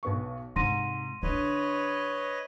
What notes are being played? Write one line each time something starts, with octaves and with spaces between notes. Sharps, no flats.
B1 B3 C#6
G#2 C3 G#3 C6 A#6 D#7
D3 D#4 E4 B4 C#5 D#5